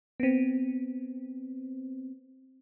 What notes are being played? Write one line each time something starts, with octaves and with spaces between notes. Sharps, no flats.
B3 C4